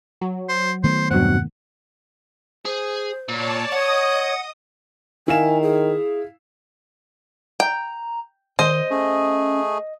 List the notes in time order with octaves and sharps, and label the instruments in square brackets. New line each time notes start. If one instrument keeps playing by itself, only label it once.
[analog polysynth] F#3
[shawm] C5
[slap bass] D#3 A3 B3 [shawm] C5
[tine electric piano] E2 G2 B2 [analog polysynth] F#3 C4 [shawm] F#5
[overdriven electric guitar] G#4 [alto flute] C5
[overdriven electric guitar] A#2 [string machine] C#5 D5 A5
[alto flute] C#5 [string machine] D#5 D#6 [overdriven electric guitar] F#5
[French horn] D#3 [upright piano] E4 F5 E7 [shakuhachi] G#5
[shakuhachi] G#4
[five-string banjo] G5 [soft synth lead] A#5
[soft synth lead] D#3 [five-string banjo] C5 [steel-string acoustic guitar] D#5
[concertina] A3 G#4 [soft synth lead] C#4